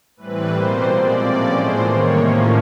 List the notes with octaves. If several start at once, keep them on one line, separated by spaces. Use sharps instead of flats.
A2 E3 G3 C4 B4
B2 G3 A#3 C5
A#2 F3 G#3 C4 D5
A2 F3 A#3 C#4 D5
A2 E3 G#3 C5
C3 D#3 G3 A#3 C#5
A2 F3 A#3 C#4 D#5